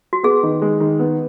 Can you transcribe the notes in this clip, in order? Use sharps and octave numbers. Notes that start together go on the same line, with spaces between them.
F#4
B3 G#4
D#3
G#3
D#3
B3